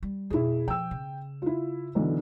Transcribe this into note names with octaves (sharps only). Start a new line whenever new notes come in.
G3
F2 B2 E4 G#4
F3 G5 E6
C#3
E4 F4
B1 D3 E3